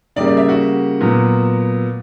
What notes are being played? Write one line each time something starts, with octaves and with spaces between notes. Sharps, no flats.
C#3 G3 A#3 D5
D5
E5
F#4
A#2 F#3 B3